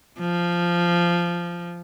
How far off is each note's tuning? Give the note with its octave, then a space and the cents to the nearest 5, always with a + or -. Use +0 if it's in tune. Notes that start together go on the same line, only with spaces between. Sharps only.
F3 -10